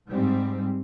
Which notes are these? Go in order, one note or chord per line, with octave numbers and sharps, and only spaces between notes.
G#2 G3 C4